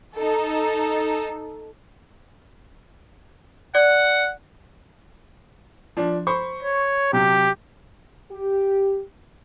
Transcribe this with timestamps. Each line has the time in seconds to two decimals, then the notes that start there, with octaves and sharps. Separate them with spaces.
0.16 D#4 A4
3.75 D5 F#5
5.97 F3 D4
6.27 C5 B5 C#6
6.63 C#5
7.13 C3 F#3 G4
8.31 G4